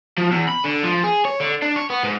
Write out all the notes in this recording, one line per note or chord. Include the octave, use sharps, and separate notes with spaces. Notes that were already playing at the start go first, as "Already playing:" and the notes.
F3
E2
B5
D3
F3
G#4
C#5
D3
D4
C#5
B3
G#2